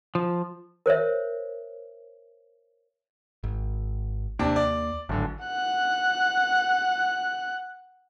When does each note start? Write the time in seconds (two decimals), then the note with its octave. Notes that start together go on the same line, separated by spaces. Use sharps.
0.15 F3
0.86 A#4 C5 C#5 E5
3.44 G#1
4.39 D#2 C3 A#3 D4
4.56 D5
5.09 D1 G#1 D3
5.45 F#5 F#6